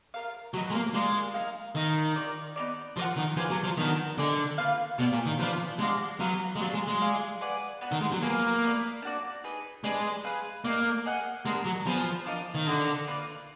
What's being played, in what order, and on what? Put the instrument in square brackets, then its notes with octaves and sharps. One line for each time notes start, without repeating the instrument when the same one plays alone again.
[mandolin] F4 A#4 F5
[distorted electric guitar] F#3 [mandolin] F#4 B4 D#5
[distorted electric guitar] G#3
A#3
[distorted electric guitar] G#3 [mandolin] A#3 F4 A#4 D5
[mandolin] D#4 A#4 F5
[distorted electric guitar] D#3 [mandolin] D#4 A#4 D#5
[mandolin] F4 A#4 D5
B3 D#4 A#4 D5
[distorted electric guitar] F3 [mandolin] F4 A#4 D5 F#5
[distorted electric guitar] D#3
[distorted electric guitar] F3 [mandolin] F4 G#4 B4 D5
[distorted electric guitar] F#3
F3
[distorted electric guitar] D#3 [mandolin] B3 D4 F#4 A#4
[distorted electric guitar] D3 [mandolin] G#4 D5
[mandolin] D#4
A#3 F4 B4 F5
[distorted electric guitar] B2 [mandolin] F4 B4 D5
[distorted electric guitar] A#2
D#3
[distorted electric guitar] F3 [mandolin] F4 B4 D5 F5
[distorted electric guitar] G#3 [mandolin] D4 F#4 D5 F5
[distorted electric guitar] F#3 [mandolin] B3 F4 B4 F5
[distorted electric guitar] G#3
[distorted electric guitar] F#3 [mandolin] B3 D4 F4
[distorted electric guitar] G#3
G#3
[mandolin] F4 G#4 D5 F5
G#4 B4 D5 F#5
B3 D4 F#4
[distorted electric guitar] D#3
G#3
F#3
[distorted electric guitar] A#3 [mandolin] F4 G#4 B4
[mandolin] B3 F4 B4 D5
D4 F#4 D5
D#4 G#4 B4
[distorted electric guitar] G#3 [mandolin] D4 G#4 B4 D5
[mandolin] G#4 B4 F5
[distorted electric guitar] A#3 [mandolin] D#4 G#4 D5
[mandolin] G#4 D#5 F#5
[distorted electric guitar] G#3 [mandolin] B3 D4 F#4 A#4
[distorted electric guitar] F#3
[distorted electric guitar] F3 [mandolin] B3 D4 G#4 B4
[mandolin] D4 F4 A#4 D#5
[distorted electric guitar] D#3
[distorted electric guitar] D3 [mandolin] D#4 F#4 D5
[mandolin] A#3 F4 B4 D5